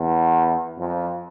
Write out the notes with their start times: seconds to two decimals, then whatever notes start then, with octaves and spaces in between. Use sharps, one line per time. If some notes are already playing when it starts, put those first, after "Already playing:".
Already playing: E2
0.78 F2